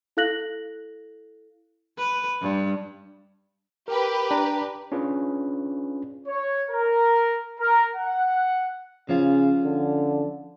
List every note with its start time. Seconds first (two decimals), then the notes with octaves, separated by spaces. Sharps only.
0.17 E4 A4 F5 F#6 A#6 F#7
1.98 B4
2.42 G2
3.88 G4 A#4 B4
4.31 D4 A#5
4.92 C#4 D4 F4 G#4 B4
6.27 C#5
6.70 A#4
7.59 A#4
7.96 F#5
9.09 C#3 F3 C#4 F4
9.65 D3